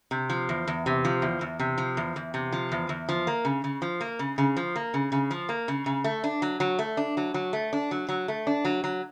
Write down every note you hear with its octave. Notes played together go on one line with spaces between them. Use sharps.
C3
F3
E2
E2
C3
F3
E2
E2
C3
F3
E2
E2
C3
F3
E2
E2
F3
A#3
C#3
C#3
F3
A#3
C#3
C#3
F3
A#3
C#3
C#3
F3
A#3
C#3
C#3
A3
D4
F#3
F#3
A3
D4
F#3
F#3
A3
D4
F#3
F#3
A3
D4
F#3
F#3